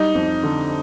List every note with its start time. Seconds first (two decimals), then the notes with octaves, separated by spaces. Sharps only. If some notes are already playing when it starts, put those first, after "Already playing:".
Already playing: G3 D#4
0.15 F2
0.43 D3